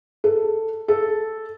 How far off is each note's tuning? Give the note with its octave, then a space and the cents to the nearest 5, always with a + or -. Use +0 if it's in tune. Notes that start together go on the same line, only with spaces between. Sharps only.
A4 +10
A4 -5